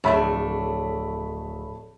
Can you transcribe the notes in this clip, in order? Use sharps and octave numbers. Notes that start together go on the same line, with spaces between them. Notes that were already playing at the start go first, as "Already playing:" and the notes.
D1 F2 A3 D4 G#4 C#5 E5 B5